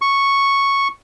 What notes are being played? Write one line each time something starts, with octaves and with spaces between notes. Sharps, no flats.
C#6